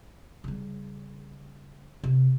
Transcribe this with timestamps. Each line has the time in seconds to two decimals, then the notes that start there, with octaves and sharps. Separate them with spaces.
0.44 C#3 G3
2.04 C3